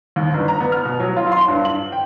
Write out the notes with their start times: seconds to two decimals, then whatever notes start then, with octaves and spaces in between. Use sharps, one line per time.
0.16 D#2
0.34 G1
0.48 A#5
0.60 B3
0.72 F6
0.85 B2
1.00 F#3
1.17 F4
1.32 C6
1.48 G2
1.65 F#7
1.92 G5